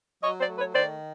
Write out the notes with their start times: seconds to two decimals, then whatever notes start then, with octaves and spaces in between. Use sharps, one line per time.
0.23 F#3 C#5 D#5
0.39 C5 D5
0.49 A3
0.57 B4 C#5
0.74 D#3 C5 D5